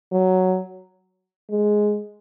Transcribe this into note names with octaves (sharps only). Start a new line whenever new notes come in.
F#3
G#3